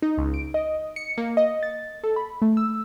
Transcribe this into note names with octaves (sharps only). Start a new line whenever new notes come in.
D#4
C#2
D7
D#5
C#7
A#3
D#5
A6
A4
B5
A3
E6